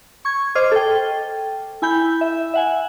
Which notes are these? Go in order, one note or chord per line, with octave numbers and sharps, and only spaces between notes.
C#6 G#6
C5 D#5 D6 F6 G#6
A4 G5
E4 G#5 B5 G6
E5
E5 F#5 G#5